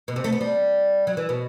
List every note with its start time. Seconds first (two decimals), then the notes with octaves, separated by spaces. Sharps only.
0.08 B2
0.16 C3
0.24 A3
0.32 B3
0.41 G3
1.07 F#3
1.17 E3
1.29 B2